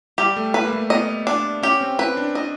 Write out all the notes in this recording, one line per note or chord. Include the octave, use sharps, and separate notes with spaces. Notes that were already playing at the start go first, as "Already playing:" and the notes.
G3 G4
A3
A3 B4
A#3
A3
B3 D#5
D4
C#4 G4
C4
C4 B4
D4
D#5